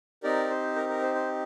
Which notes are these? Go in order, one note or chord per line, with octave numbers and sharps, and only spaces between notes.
C4 D#4 G4 A#4 D5
C5
A#4
A#4
C5
C5